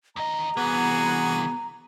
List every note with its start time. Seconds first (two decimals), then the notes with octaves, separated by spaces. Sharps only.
0.16 D#2 D#5 A#5
0.57 C2 E3 B3 F#4 G#4